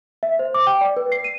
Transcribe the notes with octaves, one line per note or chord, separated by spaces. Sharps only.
E5
C5
D6
G5
D5
B4
C7
D#7